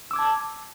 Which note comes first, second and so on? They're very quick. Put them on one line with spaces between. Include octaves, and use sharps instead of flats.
E6 D6 G#6 A5